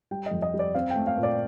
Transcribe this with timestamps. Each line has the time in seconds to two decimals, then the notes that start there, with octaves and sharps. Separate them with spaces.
0.11 G3 G5
0.26 D#5
0.31 F2
0.42 D#5
0.54 G3
0.59 D5
0.74 C4 F5
0.90 G5
0.96 A3
1.07 F5
1.18 A#2
1.23 D5